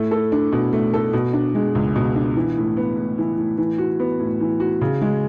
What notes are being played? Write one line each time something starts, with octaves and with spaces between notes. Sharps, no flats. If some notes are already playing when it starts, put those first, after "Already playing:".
Already playing: A2 A3
A4
D4
B2
A3
A4
B2
D4
G#3
C#2
B2
D4
E3
A2
B3
A2
E3
A2
E3
F#4
B3
A2
E3
F#4
C#3
G#3